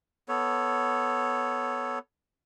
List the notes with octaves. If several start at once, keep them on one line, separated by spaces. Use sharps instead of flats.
B3 A4 C#5